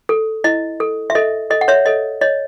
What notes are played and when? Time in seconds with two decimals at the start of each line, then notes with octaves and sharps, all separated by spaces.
0.09 A4
0.44 E4 D#5
0.80 A4
1.10 E5
1.15 A4 D#5
1.50 A4 D#5
1.61 F#5
1.68 C#5 E5
1.86 A4 D#5
2.21 C#5 D#5